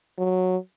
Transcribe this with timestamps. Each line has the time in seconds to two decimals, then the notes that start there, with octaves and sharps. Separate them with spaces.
0.18 F#3